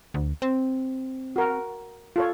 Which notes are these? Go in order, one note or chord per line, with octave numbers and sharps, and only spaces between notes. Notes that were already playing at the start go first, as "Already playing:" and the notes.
D2
C4
F#4 A#4
F4 A4 C#5